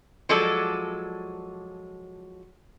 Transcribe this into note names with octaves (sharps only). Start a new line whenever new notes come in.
F3 F#3 G#3 A4 D5